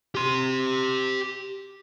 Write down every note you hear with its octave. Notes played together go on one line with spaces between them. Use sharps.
G4 C6